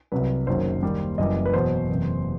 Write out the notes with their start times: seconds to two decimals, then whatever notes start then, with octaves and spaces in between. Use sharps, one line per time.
0.12 C2 C3 F#3 B4
0.47 F#1 F#2 D#3 F#3 C5
0.83 D#2 D#3 G3
1.18 F#1 F#2 E3 G3 D#5
1.46 B4
1.54 E2 B2 F#3 C5
1.89 F#1 E2 C3